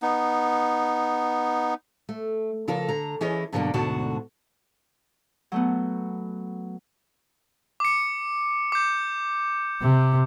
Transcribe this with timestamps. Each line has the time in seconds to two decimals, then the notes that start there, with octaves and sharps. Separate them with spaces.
0.02 B3 D#4
2.09 A3
2.68 C#3 F3 F4 A4 A#4
2.88 D3 A#5
3.21 E3 C#4 E4 G#4 C#5 D#5
3.52 G2 B2 D3 F#3 A#3 D4
3.74 D2 G#2 B2 D3 F#4 A5
5.52 F#3 A3 B3
7.80 D6 C#7
8.72 D6 G6
9.81 C3